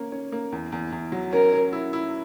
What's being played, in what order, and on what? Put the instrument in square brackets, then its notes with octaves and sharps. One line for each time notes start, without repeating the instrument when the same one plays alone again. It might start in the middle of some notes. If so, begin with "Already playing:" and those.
Already playing: [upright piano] A#3 C#4
C#4
A#3
E2
E2
E2
F#3
[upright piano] C#4 [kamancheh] A#4
[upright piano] C#4
E4
E4